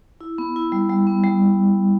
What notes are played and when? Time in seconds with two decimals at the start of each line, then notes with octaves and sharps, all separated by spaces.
0.21 E4
0.38 B3
0.56 E4
0.72 G3
0.90 G3
1.07 B3
1.24 G3